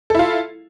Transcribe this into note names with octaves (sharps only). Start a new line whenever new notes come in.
E4 F4 A4